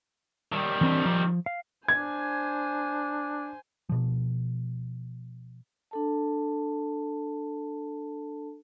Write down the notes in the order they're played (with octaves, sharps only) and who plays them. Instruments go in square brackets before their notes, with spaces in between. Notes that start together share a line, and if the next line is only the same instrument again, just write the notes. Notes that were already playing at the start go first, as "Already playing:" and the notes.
[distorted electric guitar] D#3 G3
[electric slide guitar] E3 C4 D4
F3
F5
[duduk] D4 [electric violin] C5 G#5 [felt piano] G#6
[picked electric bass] B2 F3
[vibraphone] D4 A4 A5